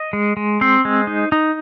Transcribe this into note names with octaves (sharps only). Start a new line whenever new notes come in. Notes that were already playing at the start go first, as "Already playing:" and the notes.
Already playing: D#5
G#3
G#3
C4 C5
G#3
D#4
D#4